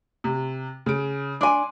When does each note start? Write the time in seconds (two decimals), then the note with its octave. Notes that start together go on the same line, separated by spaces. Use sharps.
0.24 C3
0.86 C#3 D7
1.41 D4 G#5 C6 D6